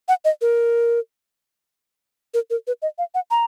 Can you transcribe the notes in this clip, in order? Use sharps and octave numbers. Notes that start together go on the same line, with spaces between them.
F#5
D#5
A#4
A#4
A#4
B4
D#5
F5
F#5
A#5